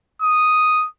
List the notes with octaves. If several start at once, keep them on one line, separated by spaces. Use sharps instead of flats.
D#6